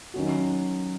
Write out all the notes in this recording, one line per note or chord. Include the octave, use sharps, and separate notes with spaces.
D#3 F#3 C#4 F#4